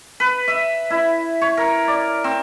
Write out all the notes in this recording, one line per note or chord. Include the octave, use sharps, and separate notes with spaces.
B4
E5
E4
C#5
A#4
D5
C4